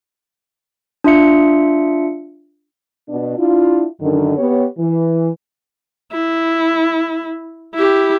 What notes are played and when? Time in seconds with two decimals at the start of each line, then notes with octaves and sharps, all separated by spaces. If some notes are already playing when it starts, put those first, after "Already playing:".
1.04 D4 F4 E5 C#7
3.08 B2 D4
3.38 D4 E4 F4
4.01 F#2 D3 D#3
4.37 B3 G4 C#5
4.78 E3
6.12 E4
7.75 E4 G4